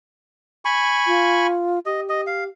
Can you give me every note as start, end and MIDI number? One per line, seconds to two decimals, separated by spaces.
0.65 1.47 80
0.65 1.47 83
0.65 1.47 85
1.07 1.79 65
1.86 2.48 67
1.86 2.00 75
2.09 2.21 75
2.27 2.44 77